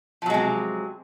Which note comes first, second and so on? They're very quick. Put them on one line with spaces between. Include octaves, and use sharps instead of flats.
F3 F#3 G#3 C3